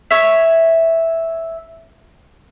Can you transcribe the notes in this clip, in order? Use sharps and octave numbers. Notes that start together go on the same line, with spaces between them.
C#5 E5